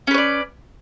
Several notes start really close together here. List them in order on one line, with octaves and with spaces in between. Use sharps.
C#4 B4 C#5 D5